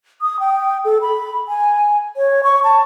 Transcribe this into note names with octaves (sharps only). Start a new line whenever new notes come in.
D#6
G5
A4
B5
G#5
C#5
C#6
A5